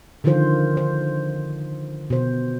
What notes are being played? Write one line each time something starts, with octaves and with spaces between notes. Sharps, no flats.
D3 D#3 F3 F4 C5
C5
B2 C5